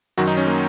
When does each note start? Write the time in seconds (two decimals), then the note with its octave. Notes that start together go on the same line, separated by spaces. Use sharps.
0.18 F#2 D#3 F#3 F#4
0.27 D#4
0.37 C#4
0.47 A#3